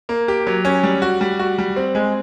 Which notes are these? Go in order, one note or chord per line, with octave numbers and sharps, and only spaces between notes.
A#3
G4
F#3
C#4
G3
F#4
G3
F#4
G3
C4
G#3